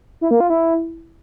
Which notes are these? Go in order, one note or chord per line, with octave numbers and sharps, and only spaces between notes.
E4
A#3
F4
E4